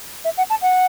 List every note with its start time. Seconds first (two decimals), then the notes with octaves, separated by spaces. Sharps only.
0.24 E5
0.37 F#5
0.50 A5
0.62 F#5